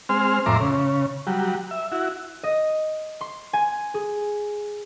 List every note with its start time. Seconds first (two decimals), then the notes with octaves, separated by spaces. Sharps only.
0.09 G#3 C4 C5 F6
0.46 F2 A2 E5 A#5 C6 D6
0.60 C#3
1.27 F#3 G3
1.71 E5
1.92 E4 F#4
2.43 D#5
3.21 C6
3.53 G#5
3.94 G#4